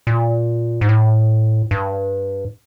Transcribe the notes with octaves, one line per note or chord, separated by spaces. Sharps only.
A#2
G#2
A2
G2